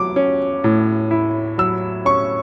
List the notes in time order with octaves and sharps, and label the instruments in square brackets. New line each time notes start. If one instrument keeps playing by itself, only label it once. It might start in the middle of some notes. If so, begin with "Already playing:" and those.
Already playing: [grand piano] F#3 D6
C#4
A2
E4
F#3 E6
C#4 C#6